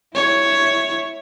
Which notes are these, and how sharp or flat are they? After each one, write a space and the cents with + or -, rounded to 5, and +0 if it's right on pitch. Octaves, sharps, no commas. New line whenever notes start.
E4 +0 C#5 +0